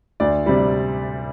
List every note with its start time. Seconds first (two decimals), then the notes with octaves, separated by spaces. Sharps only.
0.20 D2 D5
0.46 C3 G3